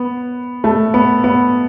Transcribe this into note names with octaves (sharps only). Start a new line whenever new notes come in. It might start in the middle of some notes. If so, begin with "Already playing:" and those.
Already playing: B3
A3
B3
B3